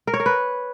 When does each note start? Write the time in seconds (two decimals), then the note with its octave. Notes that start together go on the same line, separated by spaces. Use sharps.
0.07 A#4
0.14 C#5
0.20 A#4
0.26 B4